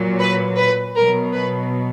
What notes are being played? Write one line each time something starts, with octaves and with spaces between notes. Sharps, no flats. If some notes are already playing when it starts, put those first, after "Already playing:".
Already playing: A#2 F#3
B4
B4
B2 F#3 A#4
B4